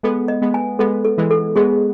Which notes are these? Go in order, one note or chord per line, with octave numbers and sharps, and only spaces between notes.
G#3 B3 A4
D#5
G#3 B3
G#5
G#3 B3 A4
A4
E3 G#3
A4
G#3 B3 G#4